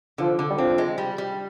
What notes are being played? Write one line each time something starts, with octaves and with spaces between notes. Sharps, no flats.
D3 F3
D3
G3
F3 C4
G#3
G3
G3